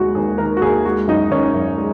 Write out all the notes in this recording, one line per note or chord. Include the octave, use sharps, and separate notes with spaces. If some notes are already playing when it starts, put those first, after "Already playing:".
Already playing: D#2 G#3 F#4
D#2 G#4
D#3 A#4
F#4
D#2 G#4
G#3 F#4
F#2 D#4
D#3 C#4
F#2
G#3